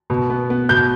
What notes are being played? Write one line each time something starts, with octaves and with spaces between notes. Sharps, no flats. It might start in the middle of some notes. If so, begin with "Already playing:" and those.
B2
B3
B3
B2 G6